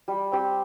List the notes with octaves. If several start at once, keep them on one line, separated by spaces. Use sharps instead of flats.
G3
C4 G4